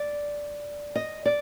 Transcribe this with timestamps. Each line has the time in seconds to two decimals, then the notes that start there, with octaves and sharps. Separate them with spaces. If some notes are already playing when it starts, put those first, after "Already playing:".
Already playing: D5
0.96 D#5
1.26 D5